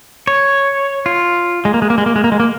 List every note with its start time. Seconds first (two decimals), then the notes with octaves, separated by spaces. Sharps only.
0.27 C#5
1.06 F4
1.65 G#3
1.74 A#3
1.82 G#3
1.90 A#3
1.98 G#3
2.06 A#3
2.16 G#3
2.24 A#3
2.32 G#3
2.40 A#3